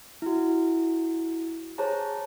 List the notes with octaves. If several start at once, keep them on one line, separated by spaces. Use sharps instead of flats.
E4 F#4
G#4 C5 C#5 A5 A#5